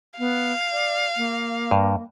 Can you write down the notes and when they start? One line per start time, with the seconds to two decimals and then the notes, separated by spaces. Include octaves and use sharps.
0.19 B3 F5
0.72 D5
1.17 A#3
1.71 G2